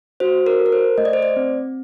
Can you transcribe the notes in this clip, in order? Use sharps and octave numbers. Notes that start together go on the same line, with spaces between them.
F#4 C5
A#4
A4
A#4
C5
A3 D#5
D5
C5
D5
C4